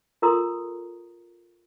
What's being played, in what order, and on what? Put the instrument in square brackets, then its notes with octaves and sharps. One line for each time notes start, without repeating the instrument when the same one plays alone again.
[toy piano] F4 A4 A#4 A#5 C6 D#6